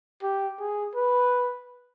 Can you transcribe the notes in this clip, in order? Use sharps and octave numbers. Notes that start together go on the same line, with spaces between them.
G4
G#4
B4